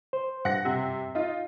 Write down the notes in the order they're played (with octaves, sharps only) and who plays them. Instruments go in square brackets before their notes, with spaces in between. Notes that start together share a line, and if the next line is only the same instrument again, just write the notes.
[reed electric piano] C5
[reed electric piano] G2 [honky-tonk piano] F#5 A#6
[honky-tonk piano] C3
D#4 F4